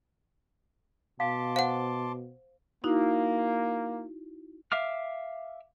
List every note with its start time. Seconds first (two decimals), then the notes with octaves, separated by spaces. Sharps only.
1.20 B2 F5 A5 C6 D6
1.56 C5 F5 F#5
2.84 A#3 D#4 E4 F#4
4.72 E5 F5 D6 F6